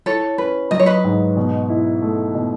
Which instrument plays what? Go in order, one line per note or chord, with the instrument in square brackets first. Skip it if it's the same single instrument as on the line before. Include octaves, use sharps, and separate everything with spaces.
[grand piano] E4 [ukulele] A4 C#5
[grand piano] C#4 [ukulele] B4
[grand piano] F#3 [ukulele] D#5
[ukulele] C#5
B4 D#5
[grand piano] G#2
B2
E4
A3
B2